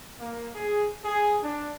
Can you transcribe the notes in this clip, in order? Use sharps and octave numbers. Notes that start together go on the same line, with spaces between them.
A#3
G#4
G#4
D4